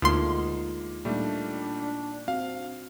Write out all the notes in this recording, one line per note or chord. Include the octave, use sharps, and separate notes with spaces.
D2 G#3 A#3 D#4 F4 C6
A#2 G3 A3 A#3 D4 D#4
C4 F#4 F5